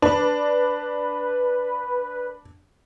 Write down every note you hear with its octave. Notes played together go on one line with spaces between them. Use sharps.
D4 B4